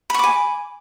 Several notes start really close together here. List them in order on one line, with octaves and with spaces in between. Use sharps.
B5 C#6 D6 G#5